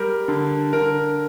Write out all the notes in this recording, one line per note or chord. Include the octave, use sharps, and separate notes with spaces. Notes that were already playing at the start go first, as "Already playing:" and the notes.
Already playing: G3 A#4
D3
D3 A#4